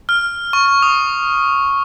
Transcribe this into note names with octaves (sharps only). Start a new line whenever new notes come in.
F6
C#6
D#6